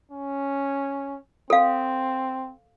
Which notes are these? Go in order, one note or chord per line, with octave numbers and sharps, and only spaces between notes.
C#4
C4 A4 F5